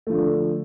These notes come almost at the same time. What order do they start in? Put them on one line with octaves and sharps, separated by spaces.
A3 F3 D3